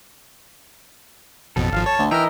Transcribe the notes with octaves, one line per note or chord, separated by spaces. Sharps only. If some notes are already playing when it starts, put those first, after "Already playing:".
A1 F2 B2 A4
G#1 F3 F5
C#5 A5
D2
E3 D#4 A#4 D#5 E5 G5 F6